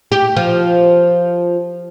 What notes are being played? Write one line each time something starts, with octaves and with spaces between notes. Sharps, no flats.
G4
F3